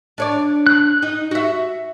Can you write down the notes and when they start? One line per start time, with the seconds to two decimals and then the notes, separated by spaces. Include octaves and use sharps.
0.18 D4 C#5 D5
0.67 F#6
1.02 D#4
1.31 F#4 E5